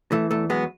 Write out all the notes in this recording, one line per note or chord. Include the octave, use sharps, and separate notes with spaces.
E3 A3
E2 A3
F#3 G#3 B3